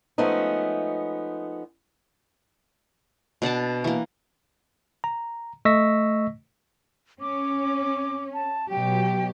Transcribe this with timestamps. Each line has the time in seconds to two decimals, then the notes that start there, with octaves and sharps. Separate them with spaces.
0.18 F3 G#3 A3 B3 C#4 D#4
3.42 B2 D4 F#5 A5
3.84 E3 A#3
5.04 A#5
5.65 A3 D#5 C#6 E6 A#6 B6
7.21 C#4 D6
8.34 A5
8.70 B2 F#3 G4 G5